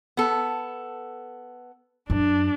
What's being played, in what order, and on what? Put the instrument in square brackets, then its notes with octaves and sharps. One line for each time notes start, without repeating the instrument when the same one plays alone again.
[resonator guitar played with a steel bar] B3 A4
[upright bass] F#2 [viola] D4